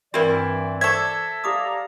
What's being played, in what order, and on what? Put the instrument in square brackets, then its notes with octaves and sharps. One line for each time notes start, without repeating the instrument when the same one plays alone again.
[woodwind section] G2 E3 D5 [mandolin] C4 E4 [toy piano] F#4 A#4 B4
[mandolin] A4 E5 [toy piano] C5 C#6 D6 [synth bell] G#6
[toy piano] G4 D6 D#6 [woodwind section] D5 F5 A#5